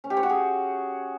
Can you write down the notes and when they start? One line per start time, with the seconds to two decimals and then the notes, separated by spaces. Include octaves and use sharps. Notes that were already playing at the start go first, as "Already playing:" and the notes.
0.04 C#4
0.10 G4
0.17 C#5
0.23 F#4
0.29 G#4